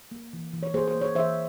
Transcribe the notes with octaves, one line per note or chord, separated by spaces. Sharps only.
A#3
E3
E3
C#5
A#3 G#4 C5
C5
A#3
C#5
E3 C5 E5